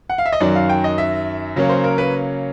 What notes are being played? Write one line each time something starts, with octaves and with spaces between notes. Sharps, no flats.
F#5
F5
E5
D#5
F#2 D#3 F#3 D5
F5
G5
D#5
E5
C#3 F#3 A#3 C#4
C5
A#4
B4